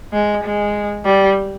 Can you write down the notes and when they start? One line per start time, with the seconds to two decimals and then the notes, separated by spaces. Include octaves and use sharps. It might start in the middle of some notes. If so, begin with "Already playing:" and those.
0.13 G#3
0.44 G#3
1.05 G3